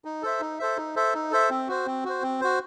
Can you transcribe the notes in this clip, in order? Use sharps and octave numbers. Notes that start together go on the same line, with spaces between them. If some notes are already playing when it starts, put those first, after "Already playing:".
D#4
A4 C5 E5
D#4
A4 C5 E5
D#4
A4 C5 E5
D#4
A4 C5 E5
C4
F#4 C5
C4
F#4 C5
C4
F#4 C5